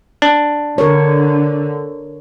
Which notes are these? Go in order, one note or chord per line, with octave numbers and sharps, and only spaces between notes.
D4
D3 A#4 C#5